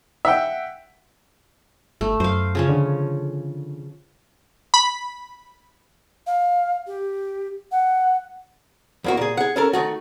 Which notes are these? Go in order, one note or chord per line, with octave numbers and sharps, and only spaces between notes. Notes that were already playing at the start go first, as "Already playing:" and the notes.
E5 F#5 G5
G1 A3
F#2 C5 F5
C#3 F3 C#4
D3
B5
F5
G4
F#5
E2 A#3 F#4
A#2 G#4
G#4 F#5
C#4 A4 A#4
D#3 A3 F#4